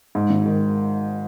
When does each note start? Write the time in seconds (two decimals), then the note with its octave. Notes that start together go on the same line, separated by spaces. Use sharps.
0.15 G#2
0.30 G#1
0.46 D#3